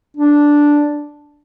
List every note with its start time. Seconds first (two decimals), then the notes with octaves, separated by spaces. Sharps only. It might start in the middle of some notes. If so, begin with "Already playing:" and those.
0.17 D4